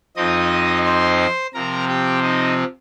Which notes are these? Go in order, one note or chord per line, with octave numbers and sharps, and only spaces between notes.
F2 F3 C4 D#4 D#5 D#6
C5 C6
C3 F3 C4 A#4 A#5
G4 G5
D#4 D#5